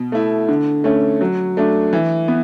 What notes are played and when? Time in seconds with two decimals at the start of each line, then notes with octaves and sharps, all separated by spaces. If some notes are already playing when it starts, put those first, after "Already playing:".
Already playing: B2
0.12 A3 E4
0.48 D3
0.84 A3 C#4
1.21 F#3
1.57 A3 D4
1.93 E3
2.28 B3